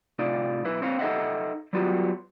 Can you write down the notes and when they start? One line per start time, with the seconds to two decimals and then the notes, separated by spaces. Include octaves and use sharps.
0.19 A2 C3 D#4 F4 D5
0.64 B1 E4 B4
0.82 C4 C5 C#5 F5
0.99 D#4 A4 D#5 E5 F#5
1.73 F#3 G3 B3 F4 F#4